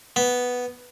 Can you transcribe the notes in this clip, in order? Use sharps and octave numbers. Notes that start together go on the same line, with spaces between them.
B3